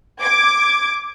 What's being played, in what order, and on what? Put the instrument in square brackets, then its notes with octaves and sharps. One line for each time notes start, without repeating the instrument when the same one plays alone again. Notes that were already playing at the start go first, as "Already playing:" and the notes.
[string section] D6 G#6